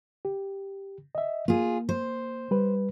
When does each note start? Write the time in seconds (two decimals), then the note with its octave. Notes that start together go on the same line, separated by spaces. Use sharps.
0.25 G4
1.15 D#5 E5
1.48 A#3 F4 G#4
1.89 C5
2.51 G3 B4